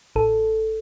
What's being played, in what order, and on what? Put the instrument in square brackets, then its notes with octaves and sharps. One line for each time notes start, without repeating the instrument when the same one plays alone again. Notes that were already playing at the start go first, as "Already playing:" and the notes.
[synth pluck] A1 A4